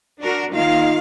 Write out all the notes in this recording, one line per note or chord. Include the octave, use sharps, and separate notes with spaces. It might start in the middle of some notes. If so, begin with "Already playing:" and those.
D4 F#4 A#4
D#3 A#3 D#4 F4 F5